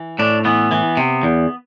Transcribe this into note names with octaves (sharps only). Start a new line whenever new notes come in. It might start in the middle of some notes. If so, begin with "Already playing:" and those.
Already playing: E3
A2 D4
E3 B3
E3
C3
E2